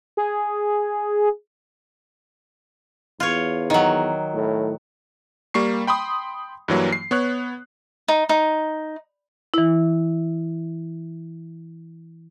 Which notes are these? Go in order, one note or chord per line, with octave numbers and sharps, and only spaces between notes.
G#4
E2 F4 C#5
D#3 F#3
A2
G3 A#3 C#6 C7
G5 B5 C6 D#6
G2 E3 F#3 A#3
C7
B3 C#5 F#6
D#4
D#4
E3 E4